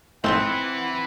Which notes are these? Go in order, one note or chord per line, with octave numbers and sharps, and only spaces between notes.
G#2 E3 C4 E4 F#5 A5 D#6